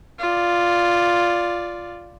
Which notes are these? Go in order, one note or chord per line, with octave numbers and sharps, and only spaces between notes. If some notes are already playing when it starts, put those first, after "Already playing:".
F4 D5